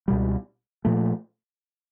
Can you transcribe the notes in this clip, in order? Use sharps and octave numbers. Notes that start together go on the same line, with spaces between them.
C#2 B2 G3
A#2 F3 A3